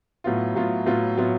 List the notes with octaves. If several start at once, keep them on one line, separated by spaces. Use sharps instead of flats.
A2 F#3 B3 F4
A2 F#3 B3 F4
A2 F#3 B3 F4
A2 F#3 B3 F4